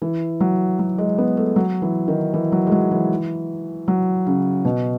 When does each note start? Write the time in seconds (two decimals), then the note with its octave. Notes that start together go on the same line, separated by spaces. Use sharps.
0.02 E3
0.40 F#3
0.79 F#3
0.98 G#3
1.18 B3
1.37 A3
1.56 F#3
1.82 E3
2.08 D#3
2.34 E3
2.52 F#3
2.67 G#3
2.72 F#3
2.91 E3
3.88 F#3
4.27 C#3
4.65 B2